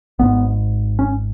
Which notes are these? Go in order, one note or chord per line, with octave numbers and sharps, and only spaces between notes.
G#1 G#2 B3
C#4